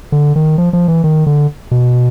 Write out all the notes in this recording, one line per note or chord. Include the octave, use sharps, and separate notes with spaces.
D3
D#3
F3
F3
E3
D#3
D3
B2